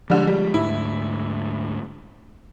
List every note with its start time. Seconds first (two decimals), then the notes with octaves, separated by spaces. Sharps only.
0.10 D3 F3 G3 G#3
0.27 G3
0.54 D2 G#2 E4